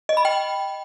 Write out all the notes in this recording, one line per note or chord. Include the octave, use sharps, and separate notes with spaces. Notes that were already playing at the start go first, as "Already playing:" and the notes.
D#5
B5
G5